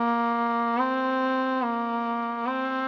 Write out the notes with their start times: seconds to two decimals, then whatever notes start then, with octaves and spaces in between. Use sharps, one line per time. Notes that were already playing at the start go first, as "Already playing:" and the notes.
Already playing: A#3
0.78 C4
1.62 A#3
2.46 C4